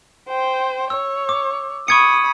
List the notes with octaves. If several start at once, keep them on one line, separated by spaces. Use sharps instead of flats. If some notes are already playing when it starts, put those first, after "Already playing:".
C5 G5
C#5 E6
D6
B5 C#6 D#6 G#6 C#7